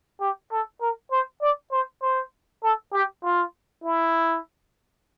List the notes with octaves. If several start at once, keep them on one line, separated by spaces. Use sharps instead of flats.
G4
A4
A#4
C5
D5
C5
C5
A4
G4
F4
E4